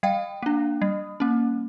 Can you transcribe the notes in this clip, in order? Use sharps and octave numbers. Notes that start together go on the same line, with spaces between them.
G3 F5 G5
A#3 D4
G3
A#3 C#4